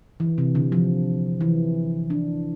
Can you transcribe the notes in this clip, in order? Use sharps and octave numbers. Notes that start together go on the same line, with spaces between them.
E3
C3
D3
F3
E3
D4